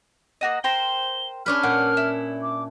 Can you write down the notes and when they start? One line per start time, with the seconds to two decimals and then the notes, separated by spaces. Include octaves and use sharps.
0.41 A#3 F#4 D#5
0.64 A#4 C5 G5 G7
1.46 C#4 D4 B4 F6
1.63 A#2 F#5
1.97 E4
2.42 D6